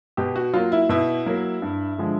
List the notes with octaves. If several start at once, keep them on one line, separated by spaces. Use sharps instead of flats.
B2 G4
F#4
F#3 A#3 F4
E4
B2 E4
F#3 A#3
G2
D3 F3 G#3